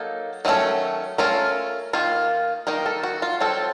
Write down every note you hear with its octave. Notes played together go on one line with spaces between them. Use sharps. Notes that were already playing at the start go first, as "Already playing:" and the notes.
Already playing: F#3 A#3 D#4 A4
D#3 F#3 A3 C#4
A3 C#4 F4 A#4
D#3 A#3 F4
D#3 A#3 D#4 A#4
A4
F#4
F4
F#3 C4 F4 A4